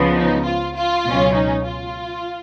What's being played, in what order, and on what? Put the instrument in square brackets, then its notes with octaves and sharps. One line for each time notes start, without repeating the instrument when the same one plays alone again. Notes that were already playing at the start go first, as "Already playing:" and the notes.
Already playing: [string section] C#2 C#3 F3 B3
D#4
F4
F4
C#2 B2 F#3 C#4
D#4
F4